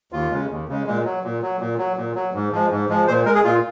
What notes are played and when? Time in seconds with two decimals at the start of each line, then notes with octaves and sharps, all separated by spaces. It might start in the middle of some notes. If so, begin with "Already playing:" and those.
0.12 D#2 F4
0.31 C#3 G#3
0.50 D#2
0.68 C#3 G#3
0.86 A#2 G#3
1.05 F#3
1.24 A#2
1.42 F#3
1.60 A#2
1.78 F#3
1.97 A#2
2.15 F#3
2.34 G#2
2.51 F3 G#3
2.70 G#2
2.89 F3 G#3
3.07 A#2 C5
3.25 G#3 A#4
3.35 G#4
3.44 A#2 F4